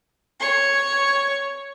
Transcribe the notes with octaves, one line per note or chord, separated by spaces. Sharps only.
C#5 C#6